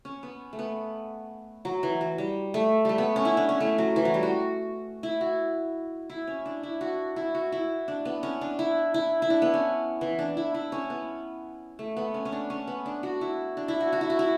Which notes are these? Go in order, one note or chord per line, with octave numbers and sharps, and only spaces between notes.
C#4
B3
A3
B3
F#3
E3
F#3
G3
A3
G3 A3
B3
C#4
E4
D4
C#4
A3
F#3
E3
F#3
G3
F#4
E4
F#4
E4
C#4
D4
E4
F#4
E4
F#4
E4
D4
B3
C#4
D4
E4
E4
E4
D4
B3
C#4
E3
D4
E4
E4
C#4
B3
A3
B3
C#4
C#4
D4
C#4
B3
D4
F#4
E4
D4
E4
F#4
F#4
E4
F#4
E4